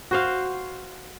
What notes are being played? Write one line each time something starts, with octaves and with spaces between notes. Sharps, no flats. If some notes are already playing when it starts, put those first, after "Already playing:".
F#4 C5 F5